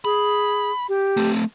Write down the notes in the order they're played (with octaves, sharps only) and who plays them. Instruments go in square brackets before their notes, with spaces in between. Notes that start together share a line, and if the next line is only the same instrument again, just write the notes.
[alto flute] G#4 [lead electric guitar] B5
[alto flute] G4
[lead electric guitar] A3 C4